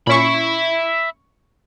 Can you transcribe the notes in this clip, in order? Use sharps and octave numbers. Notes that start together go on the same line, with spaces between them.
A#2 C#4 E5 B5 C#6